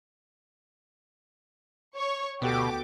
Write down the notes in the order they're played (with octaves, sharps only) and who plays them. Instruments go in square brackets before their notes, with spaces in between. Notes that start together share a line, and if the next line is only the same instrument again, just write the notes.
[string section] C#5 C#6
[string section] D2 G4 D6 [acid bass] B2 [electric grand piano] B3 F#4 A4